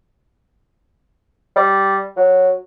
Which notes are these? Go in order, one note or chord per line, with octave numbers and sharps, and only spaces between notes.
G3
F#3